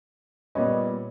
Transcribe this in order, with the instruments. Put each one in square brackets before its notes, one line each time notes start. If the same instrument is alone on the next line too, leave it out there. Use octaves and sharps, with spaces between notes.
[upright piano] A#2 G3 B3 C#5 D#5